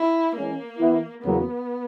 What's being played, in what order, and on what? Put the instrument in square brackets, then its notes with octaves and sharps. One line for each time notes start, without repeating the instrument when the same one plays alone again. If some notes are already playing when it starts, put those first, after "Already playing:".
Already playing: [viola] E4
[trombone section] E3 G#3 C#4 [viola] A#3
[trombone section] E3 B3 E4
[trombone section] E2 C#3 F#3 A#3 [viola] B3